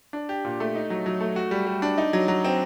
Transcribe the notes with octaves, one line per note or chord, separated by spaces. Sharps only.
D4
G4
A#2
A3
D#4
F#3
F#3
A3
F#4
G3
G3
D4
D#4
F#3
F#3
C4